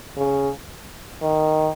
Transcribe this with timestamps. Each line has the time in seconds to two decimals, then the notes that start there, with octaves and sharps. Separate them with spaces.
0.17 C#3
1.22 D#3